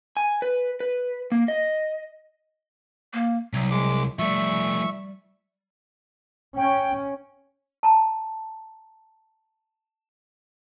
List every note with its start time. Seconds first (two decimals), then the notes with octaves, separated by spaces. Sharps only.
0.17 G#5
0.42 B4
0.80 B4
1.32 A#3
1.48 D#5
3.13 A#3
3.53 C2 F#3
3.71 G#3 D6
4.19 F3 G3 A3 E5 C#6
6.57 C#4 G5
7.83 A5 A#5